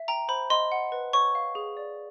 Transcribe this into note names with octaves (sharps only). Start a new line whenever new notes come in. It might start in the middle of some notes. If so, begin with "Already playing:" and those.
Already playing: E5
G5 A#5
C5 B5
D#5 C6
F#5
B4
C#5 C#6
F5
G#4
D5